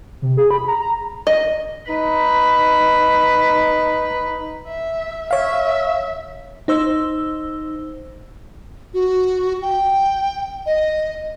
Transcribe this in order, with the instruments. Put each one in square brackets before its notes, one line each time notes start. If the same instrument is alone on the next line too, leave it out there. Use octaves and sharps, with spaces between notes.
[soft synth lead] C3
G#4
B5
A#5
A#5
[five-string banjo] D#5
[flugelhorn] D#4 [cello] B4
[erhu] E5
[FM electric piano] C#5 F5 [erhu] E5
[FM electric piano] D#4 C5 E6
[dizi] F#4
G5
D#5